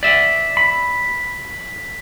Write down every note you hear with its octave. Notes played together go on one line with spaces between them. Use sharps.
D5 E5 B6
B5